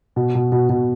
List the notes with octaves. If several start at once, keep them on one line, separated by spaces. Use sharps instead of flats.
B2
B2
B2
B2